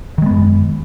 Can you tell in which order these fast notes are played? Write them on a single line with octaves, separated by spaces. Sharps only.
D#3 G#3 B3 F#2